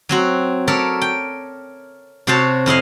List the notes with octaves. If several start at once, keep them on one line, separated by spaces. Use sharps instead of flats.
F#3 C4 F#4
A4 A#4 C#5 D5 E5
G5
C3 F#4 C5 C#5 A5
F2 E4 D#5 F5